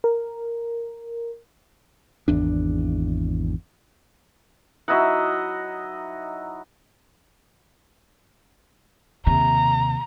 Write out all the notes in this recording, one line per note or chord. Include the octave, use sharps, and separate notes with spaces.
A#4
G#1 E2 D4
F#3 D#4 E4 D#5 E5 F#5
D#2 C3 A#5